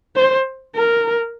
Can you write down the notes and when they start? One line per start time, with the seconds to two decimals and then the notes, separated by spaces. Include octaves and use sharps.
0.16 C5
0.76 A#4